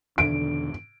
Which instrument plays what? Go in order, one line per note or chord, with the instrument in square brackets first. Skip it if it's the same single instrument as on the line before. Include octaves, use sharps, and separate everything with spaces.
[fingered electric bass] E2 B2 D#3 [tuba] D3 [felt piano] D7